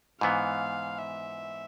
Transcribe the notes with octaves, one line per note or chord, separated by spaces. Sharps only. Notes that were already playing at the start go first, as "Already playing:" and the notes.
G#2 E3 B3 F5
E5